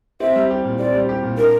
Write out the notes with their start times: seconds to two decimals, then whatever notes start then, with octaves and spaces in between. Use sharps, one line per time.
0.20 C4 E5
0.36 G3
0.51 G4
0.65 A#2
0.79 C4 D5
0.94 G3
1.09 G4
1.23 A#2
1.38 D4 A#4